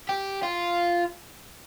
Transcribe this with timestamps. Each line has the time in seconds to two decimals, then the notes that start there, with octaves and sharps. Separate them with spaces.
0.09 G4
0.43 F4